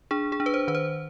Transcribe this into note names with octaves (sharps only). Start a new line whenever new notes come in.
D4 G#4
G#4
D4
B4
C5
D#3 B4
C5